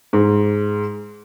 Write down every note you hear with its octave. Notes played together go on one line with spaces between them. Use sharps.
G#2